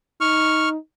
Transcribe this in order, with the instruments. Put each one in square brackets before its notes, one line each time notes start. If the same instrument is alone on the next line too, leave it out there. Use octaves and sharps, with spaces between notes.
[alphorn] D#4 [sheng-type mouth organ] C#6 F6